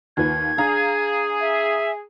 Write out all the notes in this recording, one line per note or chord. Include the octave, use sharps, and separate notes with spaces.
D#2 F4 B4 G#6
D4 G#4 F5 A#5
E5